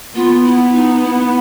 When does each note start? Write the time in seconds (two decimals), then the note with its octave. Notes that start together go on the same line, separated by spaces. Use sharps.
0.15 B3 F4
0.44 E4
0.73 D#4
1.03 E4